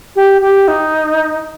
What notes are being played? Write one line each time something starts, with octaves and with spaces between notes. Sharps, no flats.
G4
G4
D#4